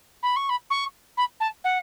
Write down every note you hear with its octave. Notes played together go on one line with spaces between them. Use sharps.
B5
C#6
B5
C#6
B5
A5
F#5